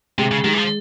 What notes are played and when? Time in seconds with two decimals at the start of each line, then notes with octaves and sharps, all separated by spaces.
0.18 C3 G#3
0.31 C#3
0.44 D#3 G#3
0.53 E3
0.58 F3